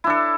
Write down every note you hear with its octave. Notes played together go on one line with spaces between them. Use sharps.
D4 E4 A4